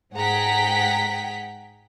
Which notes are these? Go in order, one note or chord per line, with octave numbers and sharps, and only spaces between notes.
G#2 G#4 F#5 G5 A#5 B6